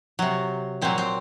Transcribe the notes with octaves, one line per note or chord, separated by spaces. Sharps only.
C3 F#3
A#2 F#3 C4
C4